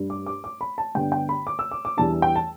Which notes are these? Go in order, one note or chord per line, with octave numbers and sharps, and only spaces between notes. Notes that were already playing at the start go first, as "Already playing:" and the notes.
Already playing: G2 G3 D4
D6
D6
D6
B5
A5
G2 D3 B3 D4 G5
G5
B5
D6
E6
D6
D6
E2 E3 G3 D4 A5
G5
A5